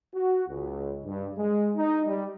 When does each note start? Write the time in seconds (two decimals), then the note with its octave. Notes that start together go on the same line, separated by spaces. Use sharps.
0.13 F#4
0.48 C#2
1.03 G2
1.36 G#3
1.74 D#4
2.05 G3